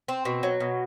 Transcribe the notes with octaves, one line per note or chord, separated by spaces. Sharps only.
C4
B2
F#3
B2